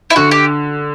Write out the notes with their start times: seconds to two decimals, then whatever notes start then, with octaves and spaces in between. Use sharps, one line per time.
0.10 E4
0.16 D3 F#4
0.31 G4